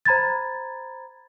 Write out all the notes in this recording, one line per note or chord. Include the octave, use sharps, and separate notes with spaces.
C5 A#5 B5 G#6 A6